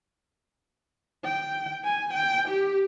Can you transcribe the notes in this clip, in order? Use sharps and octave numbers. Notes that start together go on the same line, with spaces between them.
G5
G#5
G5
G4